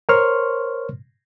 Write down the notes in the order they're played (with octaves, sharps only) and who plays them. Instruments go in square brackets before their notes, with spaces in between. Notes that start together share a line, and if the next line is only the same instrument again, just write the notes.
[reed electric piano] A#4 C5 C#5 C6 C#6 F6